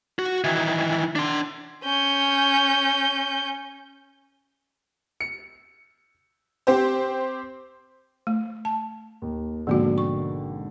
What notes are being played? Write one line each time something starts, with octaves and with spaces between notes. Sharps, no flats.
F#4
D#3 E3
D4 C6
C#4 G6
C#7
C4 G4 C5
A3
A5
D#2
G#1 B2 D3 F3 A#3 F#4
C#6